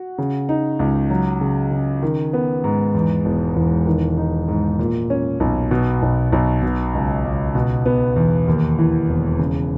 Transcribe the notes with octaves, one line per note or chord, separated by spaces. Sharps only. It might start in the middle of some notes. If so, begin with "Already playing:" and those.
Already playing: F#4
C#3
D#4
C#2
F#3
C#3
C#3
D#3
B3
G#2
E2
E1
E1
D#3
D#4
G#2
A#2
C#4
B1
B2
B1
B1
B2
C#2
C#2
B2
B3
E2
D#2
E3
E1
C#3